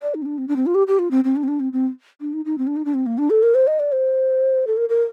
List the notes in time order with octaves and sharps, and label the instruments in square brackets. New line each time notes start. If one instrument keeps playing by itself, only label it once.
[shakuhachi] D5
D#4
C4
D4
C4
D4
C4
F4
G4
G4
F4
C4
C4
D4
C4
D4
C4
C4
D4
D#4
D#4
C4
D4
D#4
D4
C4
A#3
D4
A4
A#4
C5
D#5
D5
C5
A4
A#4
A#4